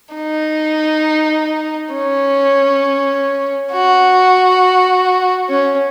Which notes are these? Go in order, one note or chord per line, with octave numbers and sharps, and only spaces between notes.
D#4
C#4
F#4
C#4